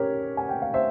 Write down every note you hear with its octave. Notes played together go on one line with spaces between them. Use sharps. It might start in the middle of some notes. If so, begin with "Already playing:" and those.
Already playing: C#4 G4 A#4 C#5
G#5
G5
F5
C5 E5